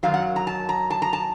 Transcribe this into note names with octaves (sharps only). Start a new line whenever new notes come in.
F#2 D#3 F#3 F5
F#5
A#5
A5
A#5
A5
A#5
A5